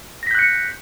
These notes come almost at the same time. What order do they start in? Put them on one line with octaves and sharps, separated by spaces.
A#6 B6 G6 F#6 C#7